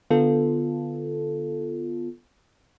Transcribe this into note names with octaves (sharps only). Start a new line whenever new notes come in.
D3 B3 F4 A4